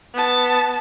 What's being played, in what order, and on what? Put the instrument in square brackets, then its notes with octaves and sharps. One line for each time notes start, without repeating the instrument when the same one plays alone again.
[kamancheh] B3 A5